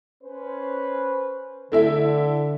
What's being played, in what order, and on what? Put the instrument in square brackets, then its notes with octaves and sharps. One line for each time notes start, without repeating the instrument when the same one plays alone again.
[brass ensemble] C#4 B4 C5
[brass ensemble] D3 [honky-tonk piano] A3 E4 E5